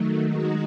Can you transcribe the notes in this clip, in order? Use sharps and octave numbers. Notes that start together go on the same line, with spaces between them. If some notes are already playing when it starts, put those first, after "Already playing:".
Already playing: D#3 F#3 A3
D#3 G#3 D#4 F#4